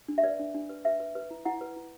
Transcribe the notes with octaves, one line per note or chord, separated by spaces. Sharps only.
D4
E5
B4 D5
D4
D4
B4
B4 E5
B4
B4
E4
E4 F#5
B4
E4